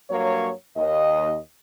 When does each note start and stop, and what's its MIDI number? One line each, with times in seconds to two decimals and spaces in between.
0.10 0.50 43
0.10 0.50 54
0.10 0.50 58
0.10 0.50 73
0.77 1.37 39
0.77 1.37 75